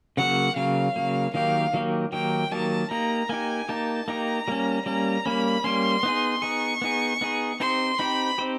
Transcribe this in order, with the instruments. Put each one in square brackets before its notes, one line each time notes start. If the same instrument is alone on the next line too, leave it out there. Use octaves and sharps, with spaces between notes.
[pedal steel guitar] C#3 F#3 A#3 [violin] F#5
[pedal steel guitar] C#3 F#3 A#3 [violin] F5
[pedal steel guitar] C#3 F#3 A#3
[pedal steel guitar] D#3 F#3 A#3 D#4 G4 [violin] F5
[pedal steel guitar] D#3 F#3 A#3 D#4 G4
[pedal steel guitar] D#3 F#3 A#3 D#4 G4 [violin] G5
[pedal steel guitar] D#3 F#3 A#3 D#4 G4 [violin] A5
[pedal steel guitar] A#3 D#4 G4 [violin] A#5
[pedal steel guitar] A#3 D#4 G4 [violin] G#5
[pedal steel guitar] A#3 D#4 G4 [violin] A5
[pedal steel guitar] A#3 D#4 G4 [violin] A#5
[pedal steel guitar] G3 A#3 C#4
[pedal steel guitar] G3 A#3 C#4 [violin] A#5
[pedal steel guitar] G3 A#3 C#4 [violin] B5
[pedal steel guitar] G3 A#3 C#4 [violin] C6
[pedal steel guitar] B3 D#4 G#4
[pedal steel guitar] B3 D#4 G#4 [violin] C#6
[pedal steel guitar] B3 D#4 G#4
B3 D#4 G#4
[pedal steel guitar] C4 D#4 G4 C5 [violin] C6
[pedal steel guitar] C4 D#4 G4 C5 [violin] B5
[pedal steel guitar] C4 D#4 G4 C5